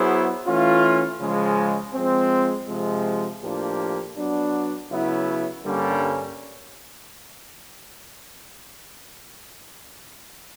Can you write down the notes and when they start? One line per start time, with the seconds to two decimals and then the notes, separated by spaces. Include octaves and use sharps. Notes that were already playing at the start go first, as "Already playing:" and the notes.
Already playing: F#3 B3 E4 G#4 C5
0.45 E3 A3 C#4 F4
1.19 C#3 F3 G#3
1.94 F3 G#3 C4
2.68 C3 F3 G#3
3.42 A2 F3 A#3 D4 G4
4.16 F#3 B3 D4
4.90 C#3 F#3 B3 E4
5.65 G2 D3 G3 A#3 C#4